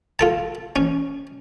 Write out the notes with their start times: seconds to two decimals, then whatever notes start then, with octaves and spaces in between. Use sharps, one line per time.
0.19 F4 A4 A5
0.76 C#4